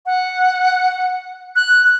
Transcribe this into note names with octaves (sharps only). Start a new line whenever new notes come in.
F#5
F#6